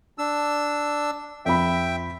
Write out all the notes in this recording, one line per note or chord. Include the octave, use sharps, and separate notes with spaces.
D4 E6
F2 E5 G5 B5